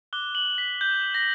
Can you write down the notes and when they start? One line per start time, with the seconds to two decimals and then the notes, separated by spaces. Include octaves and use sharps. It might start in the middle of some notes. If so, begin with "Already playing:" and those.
0.13 D6 F#6 G7
0.35 F#7
0.58 B6
0.81 G6
1.15 A#6